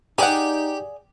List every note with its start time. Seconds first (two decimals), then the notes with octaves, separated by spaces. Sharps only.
0.18 D#4 G4 G#4 D5 F#5